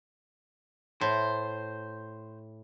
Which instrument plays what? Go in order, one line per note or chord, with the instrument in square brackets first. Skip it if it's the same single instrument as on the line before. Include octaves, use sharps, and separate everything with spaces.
[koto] A2 [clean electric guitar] C5